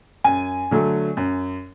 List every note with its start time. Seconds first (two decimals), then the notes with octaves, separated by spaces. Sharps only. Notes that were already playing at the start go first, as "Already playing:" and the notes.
0.24 F#2 G#5
0.71 D3 F#3 A3
1.17 F#2